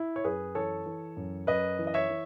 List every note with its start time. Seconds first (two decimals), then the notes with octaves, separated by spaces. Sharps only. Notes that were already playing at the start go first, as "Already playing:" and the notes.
Already playing: E4
0.16 C#5
0.24 F#2 G#4 B4
0.55 E3 A4 C#5
0.86 E3
1.17 F#2
1.47 F#2 B4 D#5
1.79 E3
1.87 D#5
1.94 C#5 E5
2.09 E3